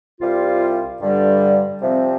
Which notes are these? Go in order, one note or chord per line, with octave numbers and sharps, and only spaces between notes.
C2 C3 G3 F4
G2 D3 G3
C3 F3 C4